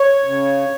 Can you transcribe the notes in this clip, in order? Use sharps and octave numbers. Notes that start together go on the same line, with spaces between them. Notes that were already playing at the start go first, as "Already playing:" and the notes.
Already playing: C#5
C#3